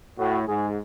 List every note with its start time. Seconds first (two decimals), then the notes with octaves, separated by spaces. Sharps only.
0.19 A2 F#4
0.47 G#2 G#4